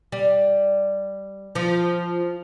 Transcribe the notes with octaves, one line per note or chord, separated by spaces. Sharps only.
G3
F3